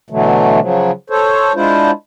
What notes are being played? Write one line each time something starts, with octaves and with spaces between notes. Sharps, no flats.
B2 D3 E3 F#3 A3
C#3 F3 F#3
A4 C5 C#5
G#3 D4 E4 F4 C5